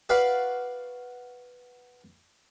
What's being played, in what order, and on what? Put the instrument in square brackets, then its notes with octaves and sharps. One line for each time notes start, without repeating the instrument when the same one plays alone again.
[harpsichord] F#4 B4 D5 F5 F#5